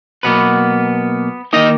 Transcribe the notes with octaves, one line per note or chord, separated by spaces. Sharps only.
B2 F#3 A#3 B3 B4
D#3 A#3 D#4 D#5